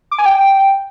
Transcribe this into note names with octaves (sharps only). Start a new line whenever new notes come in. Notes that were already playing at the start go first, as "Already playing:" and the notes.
D6
G#5
G5